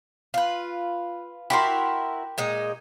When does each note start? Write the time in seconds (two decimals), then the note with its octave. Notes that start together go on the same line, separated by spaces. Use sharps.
0.34 F4 B4
1.50 E4 F#4 G4 A#4 C6
2.38 A#2 G#3 D#4